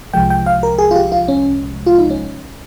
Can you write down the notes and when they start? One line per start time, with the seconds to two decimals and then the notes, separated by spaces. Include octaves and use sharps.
0.13 C2 C3 F3 G#3 G5
0.30 G5
0.46 F5
0.63 A#4
0.78 G#4
0.91 F4
0.96 G4
1.12 F4
1.28 C#4
1.86 F4
1.99 D#4
2.10 C#4